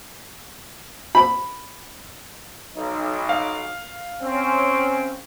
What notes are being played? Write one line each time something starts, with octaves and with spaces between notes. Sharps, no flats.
B5
B1 D#4
F5
C4 C#4